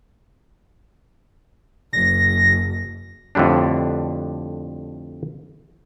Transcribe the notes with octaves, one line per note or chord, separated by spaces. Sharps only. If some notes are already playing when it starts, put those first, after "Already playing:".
F#1 A#6
F2 A2 D3 G3 D4